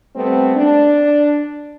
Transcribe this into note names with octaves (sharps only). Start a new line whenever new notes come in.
G3 A3 B3 C4
D4